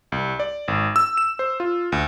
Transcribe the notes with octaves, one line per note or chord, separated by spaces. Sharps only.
C2
D5
G#1
E6
E7
C5
F4
D2